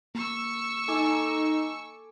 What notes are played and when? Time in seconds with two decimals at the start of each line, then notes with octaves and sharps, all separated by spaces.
0.15 A#3 C#6 E6
0.88 D#4 A4 G#5 D6